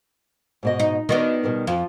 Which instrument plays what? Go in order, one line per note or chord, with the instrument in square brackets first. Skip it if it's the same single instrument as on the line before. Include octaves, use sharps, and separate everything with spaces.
[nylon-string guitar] G#2 B2 D#5
[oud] D#4
[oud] D#3 B3 D4 [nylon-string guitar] F#4 D5 D#5
[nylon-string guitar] B2 G3 A#4
[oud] F2 [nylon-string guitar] F3